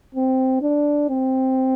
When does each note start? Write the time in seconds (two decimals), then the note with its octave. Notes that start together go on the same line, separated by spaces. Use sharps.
0.15 C4
0.62 D4
1.09 C4